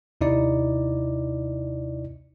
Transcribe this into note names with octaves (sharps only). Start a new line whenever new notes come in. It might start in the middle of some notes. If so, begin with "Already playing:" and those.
D#2 C3 D#4 E4 D5